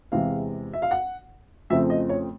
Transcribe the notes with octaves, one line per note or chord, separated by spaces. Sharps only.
E2 C3 E3 G#3 F5
E5
F5
F#5
F2 C#3 F3 A3 C4 E5
D#5
C#5